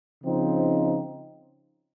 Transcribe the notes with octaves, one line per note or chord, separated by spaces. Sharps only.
C#3 F3 C4 D#4